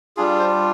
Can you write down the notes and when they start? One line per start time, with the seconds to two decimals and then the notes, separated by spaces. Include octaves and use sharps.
0.17 G3 D4 F4 G#4
0.39 C5